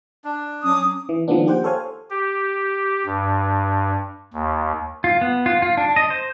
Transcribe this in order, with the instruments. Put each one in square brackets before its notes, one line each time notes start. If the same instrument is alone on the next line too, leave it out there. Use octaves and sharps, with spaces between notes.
[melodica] D4
[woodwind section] F#3 D6 D#6 [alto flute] C#4
[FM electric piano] E3
D#3 F3 G#3 A#3 B3 D4
A#3 G4 C5 F#5 G5
A4 C5 C#5 F5 G#5
[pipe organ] G4
G2
D#2
[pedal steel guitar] F4
B3
F4
F4
D4
D#5
C5